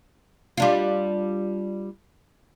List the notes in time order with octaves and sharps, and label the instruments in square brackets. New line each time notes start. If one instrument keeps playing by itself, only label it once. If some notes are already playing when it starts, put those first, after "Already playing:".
[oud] G3 D4 F4